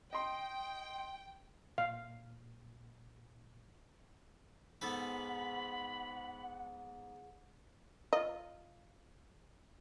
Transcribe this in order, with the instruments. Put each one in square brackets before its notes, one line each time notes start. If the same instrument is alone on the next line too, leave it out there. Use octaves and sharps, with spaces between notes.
[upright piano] D#5 C6 [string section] G5
[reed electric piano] A#2 [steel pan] F5
[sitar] G#2 [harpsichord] B3 A4 B4 [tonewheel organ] F#5 [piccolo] B5
[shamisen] F4 D#5